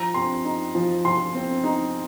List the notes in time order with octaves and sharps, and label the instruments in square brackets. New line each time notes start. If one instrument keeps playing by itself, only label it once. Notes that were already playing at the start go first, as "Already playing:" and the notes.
Already playing: [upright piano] F3 A#5
C4 C6
D#4
F3
F3 C6
C4
D#4